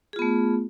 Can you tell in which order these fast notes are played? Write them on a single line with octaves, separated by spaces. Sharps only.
G#4 F4 B3 A3